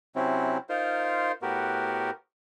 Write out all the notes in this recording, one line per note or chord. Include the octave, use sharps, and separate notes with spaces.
C3 F#3 C4 C#4 E4
D#4 F4 A#4 C5
A2 B3 F#4 G4 A#4